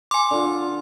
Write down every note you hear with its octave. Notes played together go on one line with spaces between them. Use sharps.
G#5 C6 D6
D3 F4